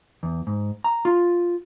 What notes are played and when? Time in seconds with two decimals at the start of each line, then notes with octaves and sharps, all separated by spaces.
0.23 E2
0.47 G#2
0.84 A#5
1.05 F4